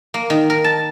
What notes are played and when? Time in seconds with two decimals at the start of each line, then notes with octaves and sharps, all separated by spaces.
0.14 A#3
0.30 D#3
0.50 A#4
0.64 A5